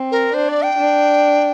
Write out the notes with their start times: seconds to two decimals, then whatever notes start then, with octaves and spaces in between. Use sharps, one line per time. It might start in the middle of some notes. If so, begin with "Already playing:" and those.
Already playing: C4
0.11 A#4
0.34 D4 C5
0.49 D5
0.64 G5
0.78 D4